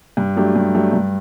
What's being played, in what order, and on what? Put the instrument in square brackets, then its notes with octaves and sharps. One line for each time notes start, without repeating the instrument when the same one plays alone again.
[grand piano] G2
F#3 A3 D4 G4
G2
F#3 A3 D4 G4
G2